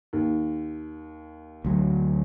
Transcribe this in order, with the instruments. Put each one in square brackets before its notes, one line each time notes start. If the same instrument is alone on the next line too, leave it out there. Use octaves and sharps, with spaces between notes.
[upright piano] D#2
[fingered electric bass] D2 F#3